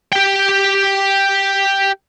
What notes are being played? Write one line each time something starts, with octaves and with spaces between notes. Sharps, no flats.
G4 G5